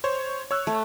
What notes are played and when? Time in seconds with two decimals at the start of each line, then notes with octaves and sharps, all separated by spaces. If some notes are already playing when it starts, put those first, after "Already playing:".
0.04 C5 C#5
0.51 C#5 E6 F#6
0.67 A3